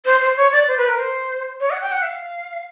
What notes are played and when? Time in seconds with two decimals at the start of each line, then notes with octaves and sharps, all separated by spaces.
0.05 C5
0.21 C5
0.37 C#5
0.52 D5
0.68 C5
0.77 B4
0.88 A#4
0.98 C5
1.60 C#5
1.71 F#5
1.81 G5
1.92 F#5
2.02 E5
2.07 F5